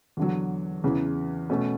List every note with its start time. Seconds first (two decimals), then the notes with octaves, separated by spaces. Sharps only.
0.17 E2 D3 F#3
0.84 E2 C#3 E3
1.50 B2 A3 C#4